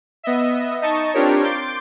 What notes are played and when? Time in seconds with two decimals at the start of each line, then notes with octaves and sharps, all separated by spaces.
0.24 B3 D#5 E5
0.82 D#4 D#5 A5 C#6
1.14 C4 D4 F4 G4 A#4 C#5
1.43 C6 D6 G6 A6 D7